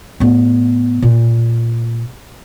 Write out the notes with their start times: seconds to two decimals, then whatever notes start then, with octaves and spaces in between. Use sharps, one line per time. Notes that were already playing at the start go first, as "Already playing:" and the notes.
0.20 A2 B3
1.02 A#2